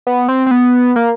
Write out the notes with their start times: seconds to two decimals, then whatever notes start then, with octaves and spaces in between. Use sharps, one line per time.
0.07 B3
0.29 C4
0.46 C4
0.51 B3
0.96 A#3